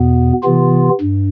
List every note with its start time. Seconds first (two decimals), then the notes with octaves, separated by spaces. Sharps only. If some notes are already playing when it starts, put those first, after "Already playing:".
Already playing: E2 B2 B3
0.43 C3 E3 B3 F4
1.01 G2